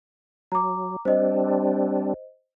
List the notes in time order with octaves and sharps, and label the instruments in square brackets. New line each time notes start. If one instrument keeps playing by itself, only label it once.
[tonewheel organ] F#3 [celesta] A#5 D6
[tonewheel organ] G3 C4 D4 [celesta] C5 D#5